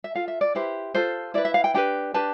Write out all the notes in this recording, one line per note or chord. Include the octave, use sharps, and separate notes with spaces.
E5
F4 A4 F5
E5
D5
E4 G4 B4 C5
F4 A4 C5
E4 B4 D5
E5
F5
G5
D4 G4 B4 G5
D4 G4 B4 A5